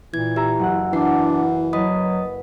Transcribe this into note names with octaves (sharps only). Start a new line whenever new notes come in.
A#2 E3 G#6
G4 E5 A#5
F#1 F#5
E3 D4 F#5 C7
F#3 B4 D#5 D#6